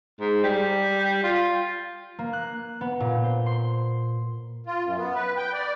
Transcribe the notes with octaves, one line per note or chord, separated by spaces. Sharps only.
G#2
G3
F4
A#3
F#6
B3
A#2
C5
C6
F4
F#2
B3
B4
G5
D5